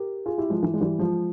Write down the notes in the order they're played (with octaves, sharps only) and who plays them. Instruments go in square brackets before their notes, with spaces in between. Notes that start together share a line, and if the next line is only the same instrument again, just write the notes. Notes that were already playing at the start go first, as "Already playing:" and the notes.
Already playing: [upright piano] G4 A#4
F4 G#4
E4 G4
F3 G#3
E3
G#3
E3 G3
F3 G#3